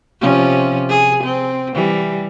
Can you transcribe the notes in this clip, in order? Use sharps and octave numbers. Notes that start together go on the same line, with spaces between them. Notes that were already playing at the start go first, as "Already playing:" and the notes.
C3 F3 C#4
G#4
C4
E3 G3